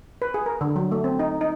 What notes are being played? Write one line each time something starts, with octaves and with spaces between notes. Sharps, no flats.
B4
G#4
A#4
D3
F#3
A3
C4
D#4
D#4